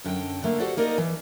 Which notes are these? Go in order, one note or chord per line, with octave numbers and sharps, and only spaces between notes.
F#2 D3 G5
D3 A3 A#3
F#4 G4 A4 C5 D5 F#5
A#3 D#4 A#4 D5 D#5
E3